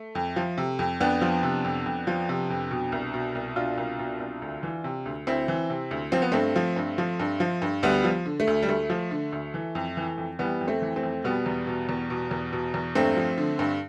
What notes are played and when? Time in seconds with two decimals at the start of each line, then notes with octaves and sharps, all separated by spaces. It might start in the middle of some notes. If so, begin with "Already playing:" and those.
Already playing: A3
0.15 F2
0.36 F3
0.58 C3
0.79 F2
1.00 F2 B3 D4
1.21 F3
1.43 C3
1.65 F2
1.86 F2
2.07 F3
2.29 C3
2.50 F2
2.71 B2
2.92 C2
3.14 B2
3.35 C2
3.56 B2 D4 F4
3.78 C2
3.99 B2
4.20 C2
4.42 D2
4.63 E3
4.84 C3
5.06 D2
5.27 D2 C4 E4
5.48 E3
5.70 C3
5.91 D2
6.12 F3 C4
6.22 B3
6.32 G2 A3 C4
6.56 F3
6.76 G2
6.98 F3
7.20 G2
7.40 F3
7.62 G2
7.83 D2 G3 B3
8.04 F3
8.26 D3
8.40 A3
8.47 D2
8.63 G3
8.69 D2 A3
8.90 F3
9.11 D3
9.33 D2
9.54 E3
9.75 F2
9.97 E3
10.18 F2
10.39 E3 G3 B3
10.61 F2
10.68 A3 C4
10.82 E3
10.96 A3 C4
11.03 F2
11.24 B2 G3 B3
11.46 E2
11.67 B2
11.89 E2
12.10 B2
12.31 E2
12.52 B2
12.74 E2
12.95 G2 A3 C4
13.17 F3
13.38 D3
13.59 G2